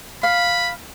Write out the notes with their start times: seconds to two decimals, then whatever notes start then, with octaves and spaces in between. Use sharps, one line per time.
0.23 F5 B5